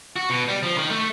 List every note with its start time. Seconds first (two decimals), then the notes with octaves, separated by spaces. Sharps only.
0.16 F#4
0.30 B2
0.48 G3
0.63 F3
0.78 D#3
0.90 A3